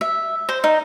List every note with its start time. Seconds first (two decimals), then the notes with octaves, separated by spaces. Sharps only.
0.01 E5
0.49 C5
0.64 D#4